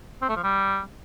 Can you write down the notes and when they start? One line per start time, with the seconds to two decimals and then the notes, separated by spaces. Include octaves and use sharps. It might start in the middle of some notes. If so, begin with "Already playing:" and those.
0.22 C4
0.29 A3
0.36 F3
0.44 G3